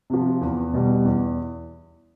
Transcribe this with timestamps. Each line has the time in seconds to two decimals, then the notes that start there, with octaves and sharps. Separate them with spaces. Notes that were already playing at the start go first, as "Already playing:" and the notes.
0.10 C3 F3
0.41 E2
0.73 B2 G3
1.05 E2